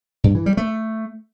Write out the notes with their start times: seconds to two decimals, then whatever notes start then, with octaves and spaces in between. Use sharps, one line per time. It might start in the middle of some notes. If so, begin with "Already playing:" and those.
0.24 G2
0.35 E3
0.46 G3
0.57 A3